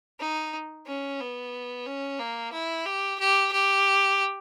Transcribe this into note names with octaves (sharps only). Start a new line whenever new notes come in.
D#4
C#4
B3
C#4
A#3
E4
G4
G4
G4